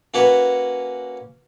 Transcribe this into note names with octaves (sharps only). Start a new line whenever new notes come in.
A#3 C#4 F#4 B4 C#5